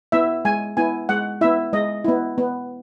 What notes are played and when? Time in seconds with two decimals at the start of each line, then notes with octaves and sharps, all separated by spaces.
0.12 B3 E4 E5
0.45 G#3 G#5
0.77 B3 E4 G#5
1.09 G#3 F#5
1.41 B3 E4 E5
1.73 G#3 D#5
2.04 B3 E4
2.38 B3